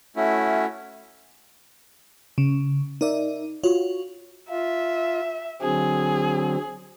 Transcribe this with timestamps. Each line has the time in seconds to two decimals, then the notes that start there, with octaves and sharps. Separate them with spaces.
0.16 A3 C#4 E4 F#4
2.38 C#3
3.01 D#4 A#4 D5 E5
3.63 F4 F#4 C#5
4.50 F4 E5
5.62 D3 F#3 C4 G#4